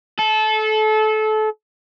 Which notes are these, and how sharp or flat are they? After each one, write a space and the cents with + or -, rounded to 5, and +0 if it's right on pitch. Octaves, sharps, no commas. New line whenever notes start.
A4 -25